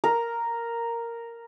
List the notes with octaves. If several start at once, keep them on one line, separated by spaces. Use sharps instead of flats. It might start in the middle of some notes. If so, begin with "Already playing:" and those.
A#4